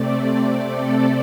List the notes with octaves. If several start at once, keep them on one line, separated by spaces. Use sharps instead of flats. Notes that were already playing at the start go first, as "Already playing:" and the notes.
Already playing: C3 A3 C4 D5
D5
A4